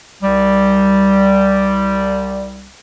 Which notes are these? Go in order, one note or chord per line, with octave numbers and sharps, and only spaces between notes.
C2 G3